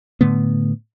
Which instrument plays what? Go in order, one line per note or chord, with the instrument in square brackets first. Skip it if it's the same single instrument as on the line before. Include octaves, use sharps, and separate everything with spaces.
[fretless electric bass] A2 D3 A3 B3